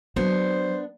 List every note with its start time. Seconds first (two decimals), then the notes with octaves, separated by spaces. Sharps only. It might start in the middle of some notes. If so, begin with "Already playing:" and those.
0.16 F#3 B3 D4 C5